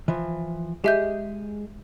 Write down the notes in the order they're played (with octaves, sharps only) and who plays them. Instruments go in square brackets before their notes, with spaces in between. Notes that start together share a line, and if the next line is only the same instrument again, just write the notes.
[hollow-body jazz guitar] E3 F3
[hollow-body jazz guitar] G#3 G#4 [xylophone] G4 E5 G6